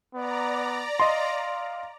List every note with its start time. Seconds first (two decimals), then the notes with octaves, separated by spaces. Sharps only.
0.15 B3 D5 A#5
1.00 D#5 F5 C6